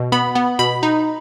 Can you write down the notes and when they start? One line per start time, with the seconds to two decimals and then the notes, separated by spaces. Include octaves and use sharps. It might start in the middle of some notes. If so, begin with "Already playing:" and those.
Already playing: B2
0.12 B3 B5
0.35 B3
0.59 B2 B5
0.83 D#4